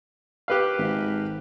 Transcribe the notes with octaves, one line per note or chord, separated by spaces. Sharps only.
G4 B4 F5
G#1